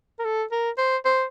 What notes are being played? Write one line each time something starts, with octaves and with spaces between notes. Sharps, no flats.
A#4
A4
A#4
C5
C5